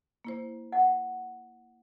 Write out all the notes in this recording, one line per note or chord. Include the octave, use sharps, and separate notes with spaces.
A#3 E4 C5
F#5